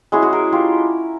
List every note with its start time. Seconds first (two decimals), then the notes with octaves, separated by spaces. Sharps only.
0.12 G#3 C#4 E4 F#4 G#4
0.22 F#4 G#4
0.32 G#4 A#4
0.52 F4 G4